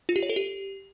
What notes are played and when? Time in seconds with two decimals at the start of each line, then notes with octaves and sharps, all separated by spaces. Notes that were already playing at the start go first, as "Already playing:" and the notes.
0.09 F4
0.16 G4
0.23 C#5
0.29 A4
0.36 G4